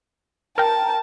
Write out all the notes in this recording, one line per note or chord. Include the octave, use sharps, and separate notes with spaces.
A#4 G5 A5